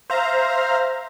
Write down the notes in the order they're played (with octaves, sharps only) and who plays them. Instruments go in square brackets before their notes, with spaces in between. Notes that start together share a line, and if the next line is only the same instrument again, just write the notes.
[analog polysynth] C5 E5 F5 A#5